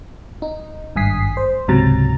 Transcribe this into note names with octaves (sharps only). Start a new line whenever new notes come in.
D#4
G#1 G2 G#5 D#6 B6 C7
C5
C#2 G#2 C3 F#3 A#5 A6